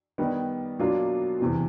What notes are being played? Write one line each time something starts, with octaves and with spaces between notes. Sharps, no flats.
D#3 G3 B3
B2 F#3 A#3 D4 F4
E2 C3 E3